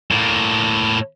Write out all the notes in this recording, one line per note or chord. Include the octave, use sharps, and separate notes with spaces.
A2 A#3